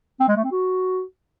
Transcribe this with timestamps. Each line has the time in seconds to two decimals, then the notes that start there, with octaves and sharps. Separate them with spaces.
0.20 C4
0.28 G#3
0.36 A3
0.44 C4
0.52 F#4